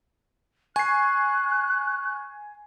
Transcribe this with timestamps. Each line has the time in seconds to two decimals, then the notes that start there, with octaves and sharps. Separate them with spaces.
0.76 G#5 C#6 F#6 C7